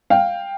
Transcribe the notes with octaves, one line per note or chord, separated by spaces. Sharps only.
F5 G5